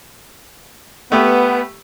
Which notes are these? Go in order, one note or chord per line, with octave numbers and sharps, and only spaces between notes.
A3 B3 G4